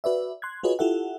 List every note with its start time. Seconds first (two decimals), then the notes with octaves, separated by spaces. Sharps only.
0.04 F#4 B4 D5 E5
0.42 C6 F#6 G#6
0.63 F4 F#4 G#4 B4 C#5 D#5
0.79 E4 F4 G4 A4 E5 F#5